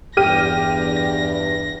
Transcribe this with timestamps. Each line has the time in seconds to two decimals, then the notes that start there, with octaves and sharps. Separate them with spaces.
0.17 E2 G2 G4 F6 A#6 D#7